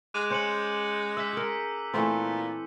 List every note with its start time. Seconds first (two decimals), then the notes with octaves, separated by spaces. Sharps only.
0.14 G#3 D6 F#6 D#7
0.30 C#4 C5 G6 C#7 F#7
1.17 E5 E6 B6
1.33 G#4 A#4
1.94 A#2 E3 A3 C4